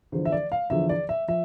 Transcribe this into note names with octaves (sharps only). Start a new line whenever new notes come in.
E2 D3 F3 C5
E5
D5
F5
E2 D3 F3 E5
D5
E5
F3 E5